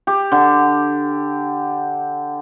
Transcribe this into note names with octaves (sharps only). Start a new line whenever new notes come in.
G4
D3